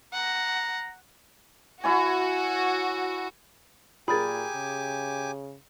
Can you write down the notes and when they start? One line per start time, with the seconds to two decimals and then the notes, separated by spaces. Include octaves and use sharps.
0.13 F#5 A#5
1.84 E4 F#4 C#5 G#5
4.08 A#2 G4 G#4 A#4 G#5 B5 D6 A6
4.55 C#3